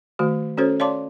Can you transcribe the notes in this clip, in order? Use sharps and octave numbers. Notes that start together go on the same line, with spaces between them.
D#3 A3 F#4
C#4 F#4 A4 C5 C#5
C#5 D5 F5 A5 C6 D6